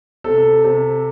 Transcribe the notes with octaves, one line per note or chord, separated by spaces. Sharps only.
C3 A4
C3